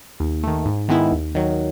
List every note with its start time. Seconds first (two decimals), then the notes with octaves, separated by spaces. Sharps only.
0.20 D#2
0.43 D#3 A3
0.66 G#2
0.89 D#3 G#3 B3 E4
1.12 D#2
1.35 D#3 F#3